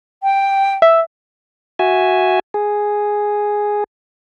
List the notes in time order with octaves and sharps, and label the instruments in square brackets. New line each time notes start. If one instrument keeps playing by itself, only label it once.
[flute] G5
[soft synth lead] E5
[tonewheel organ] F#4 E5 G#5
G#4